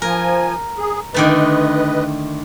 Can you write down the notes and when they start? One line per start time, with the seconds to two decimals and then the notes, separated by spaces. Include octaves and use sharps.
0.02 F3 A#4 G#5
0.78 G#4
1.14 D3 D#3 A3 B4 D#5